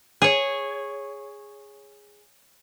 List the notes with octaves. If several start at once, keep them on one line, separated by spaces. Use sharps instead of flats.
G#4 C#5